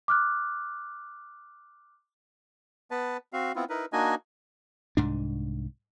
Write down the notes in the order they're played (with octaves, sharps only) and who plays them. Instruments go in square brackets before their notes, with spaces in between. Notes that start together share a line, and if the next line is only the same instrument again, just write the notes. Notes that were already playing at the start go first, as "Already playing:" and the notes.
[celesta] D6 F6 F#6
[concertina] B3 B4 A5
C4 F#4 F5
B3 C4 E4 F4
D#4 E4 A#4 B4
A#3 D4 D#4 F#4 D#5 G#5
[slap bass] C2 G#2 D4